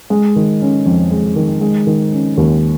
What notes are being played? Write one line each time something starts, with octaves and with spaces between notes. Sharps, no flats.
G#3
D#3
C#4
F2
G#3
D#3
G#3
D#3
C#4
D#2